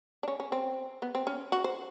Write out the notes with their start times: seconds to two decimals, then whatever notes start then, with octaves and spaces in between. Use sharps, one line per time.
0.23 D4
0.28 C#4
0.40 C#4
0.52 C4
1.02 B3
1.15 C4
1.27 C#4
1.52 F#4
1.64 C5